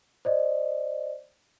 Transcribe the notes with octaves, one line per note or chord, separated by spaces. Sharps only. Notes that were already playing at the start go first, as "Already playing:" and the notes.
C5 D5 D#5